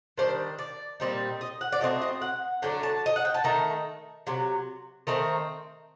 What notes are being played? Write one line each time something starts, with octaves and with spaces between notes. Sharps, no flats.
D#3 G3 D4 C5
D5
A#2 G3 C4 D#4
D#5
F#5
D5
F#3 A3 C4 D#5
D#5
F#5
D3 F#3 A3 D4 G5
A5
D#5
F#5
G5
A5
D#3 A3 D#4 A#5
C3 F#3
D#3 A3 C4 A#5